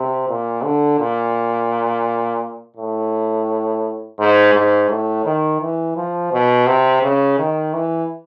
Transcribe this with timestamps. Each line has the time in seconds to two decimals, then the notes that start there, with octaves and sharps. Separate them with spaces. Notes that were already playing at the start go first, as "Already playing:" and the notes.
Already playing: C3
0.29 A#2
0.63 D3
0.99 A#2
2.76 A2
4.19 G#2
4.54 G#2
4.89 A2
5.25 D#3
5.61 E3
5.96 F3
6.32 B2
6.67 C3
7.03 C#3
7.39 D#3
7.73 E3